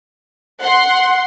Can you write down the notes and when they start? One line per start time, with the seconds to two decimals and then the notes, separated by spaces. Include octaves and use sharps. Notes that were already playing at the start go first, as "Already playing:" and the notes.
0.62 F#5 C6